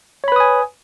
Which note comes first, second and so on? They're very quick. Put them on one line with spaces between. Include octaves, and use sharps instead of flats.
C#5 B5 B4 D#6 G#5